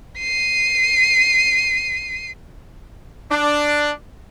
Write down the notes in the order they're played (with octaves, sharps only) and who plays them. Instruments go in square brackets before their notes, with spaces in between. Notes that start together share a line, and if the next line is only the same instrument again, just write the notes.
[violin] C7 D#7
[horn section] D4